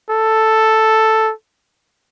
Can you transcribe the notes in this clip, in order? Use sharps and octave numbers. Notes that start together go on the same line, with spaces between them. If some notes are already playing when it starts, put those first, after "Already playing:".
A4